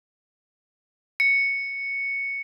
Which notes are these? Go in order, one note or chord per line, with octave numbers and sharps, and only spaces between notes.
C#7